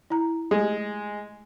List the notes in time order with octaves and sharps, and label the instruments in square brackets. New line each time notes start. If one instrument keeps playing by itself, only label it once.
[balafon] E4 A#5
[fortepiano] G#3 [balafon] A3 G4 G#4